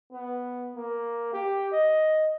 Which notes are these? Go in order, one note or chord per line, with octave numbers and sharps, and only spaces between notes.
B3
A#3
G4
D#5